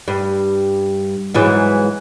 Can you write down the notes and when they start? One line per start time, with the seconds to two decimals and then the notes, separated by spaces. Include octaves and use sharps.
0.08 G2
1.34 G#2 E3 F#3